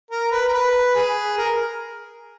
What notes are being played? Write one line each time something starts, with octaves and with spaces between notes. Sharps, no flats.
A#4
B4
A#4
B4
G#4
A#4